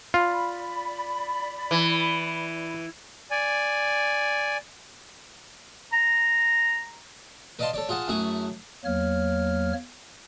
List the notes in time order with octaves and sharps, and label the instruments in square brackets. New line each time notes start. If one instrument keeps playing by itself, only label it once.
[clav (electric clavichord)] F4 [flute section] D5 B5
[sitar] E3
[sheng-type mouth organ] D5 G#5
[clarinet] A#5
[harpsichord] B4 D5 D#5 F5 A5 C6
A4 C#5 D5
F4 G#4 F#5 A5
F#2 A3 E4 G#4 F#5 C#6
[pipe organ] E2 F#3 A#3 C#5 F6